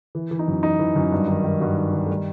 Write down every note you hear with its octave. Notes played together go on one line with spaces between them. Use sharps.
E3
E3
D#4
F#2
E3 D#4
E3
F#2
G2
D#3
D#3
G2 F#4
D#3
D#3
A3
G3